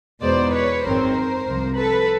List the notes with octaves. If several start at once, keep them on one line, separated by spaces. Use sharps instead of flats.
E2 B2 G#3 B3 D#4 C5 D5
B4 C#5
G#1 F#2 D#3 G#3 C4 A#4 C5
C2 C3 F3
A4 B4